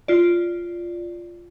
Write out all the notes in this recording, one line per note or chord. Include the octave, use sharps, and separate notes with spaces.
F4 D5